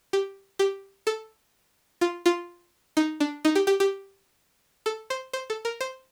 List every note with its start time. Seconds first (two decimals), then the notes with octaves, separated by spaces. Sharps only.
0.13 G4
0.59 G4
1.07 A4
2.01 F4
2.26 F4
2.97 D#4
3.20 D4
3.45 D#4
3.55 G4
3.67 G4
3.80 G4
4.86 A4
5.10 C5
5.33 C5
5.50 A4
5.65 A#4
5.81 C5